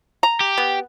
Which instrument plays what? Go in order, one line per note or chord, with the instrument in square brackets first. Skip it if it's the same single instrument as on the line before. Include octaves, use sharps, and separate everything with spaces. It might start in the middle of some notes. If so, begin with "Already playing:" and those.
[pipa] A#5
[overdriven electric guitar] G4
[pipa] B3